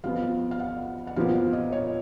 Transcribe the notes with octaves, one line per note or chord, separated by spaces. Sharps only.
F2 F3 B3 F5
F5
F#5
F#5
A#2 F3 B3 F5
F5
D#5
C#5